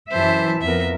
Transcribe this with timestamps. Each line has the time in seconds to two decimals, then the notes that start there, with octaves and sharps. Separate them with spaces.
0.11 F#2 E3 C5 E5 A5
0.62 F2 B3 A#4 E5